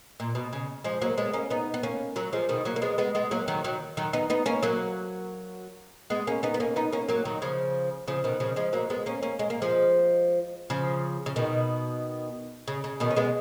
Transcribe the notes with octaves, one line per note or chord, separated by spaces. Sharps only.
A#2
B2
C#3
F3 G#3
F#3 A#3
G#3 B3
A#3 C#4
B3 D#4
B3
A#3 C#4
F#3 A#3
F3 G#3
B2 D#3
F#3 A#3
A#3
G#3 B3
G#3 B3
G#3 B3
F#3 A#3
D#3 F#3
D#3 F#3
D#3 F#3
B3 D#4
B3 D#4
A#3 C#4
F#3 A#3
G#3 B3
A#3 C#4
B3 D#4
B3
A#3 C#4
B3 D#4
A#3 C#4
F#3 A#3
D#3 F#3
C#3 F3
C#3 F3
B2 D#3
C#3 F3
F3 G#3
F#3 A#3
G#3 B3
A#3 C#4
A#3 C#4
G#3
A#3
F3 G#3
C#3 F3
C#3
B2 D#3
C#3
C#3
B2 D#3
C#4
G#3 B3